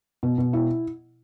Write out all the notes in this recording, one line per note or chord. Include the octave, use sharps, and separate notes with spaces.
B2
B2
E4